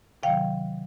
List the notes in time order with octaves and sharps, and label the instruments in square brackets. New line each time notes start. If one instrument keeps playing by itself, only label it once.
[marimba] C3 D#3 F#3 F5 G5